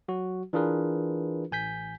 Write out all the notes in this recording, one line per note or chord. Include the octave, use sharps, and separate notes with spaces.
F#3 F#4
E3 D4 F4 G#4 A#4 B4
A1 G#5 G6 B6